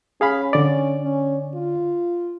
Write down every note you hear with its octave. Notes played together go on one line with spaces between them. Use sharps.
C#4 G#4 F5 B5
D3 D5
C#4
F4